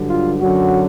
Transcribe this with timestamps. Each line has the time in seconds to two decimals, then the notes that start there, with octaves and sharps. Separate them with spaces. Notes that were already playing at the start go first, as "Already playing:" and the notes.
Already playing: G2 D3 F#3
0.10 F4
0.41 F#2 D3 F#3 F#4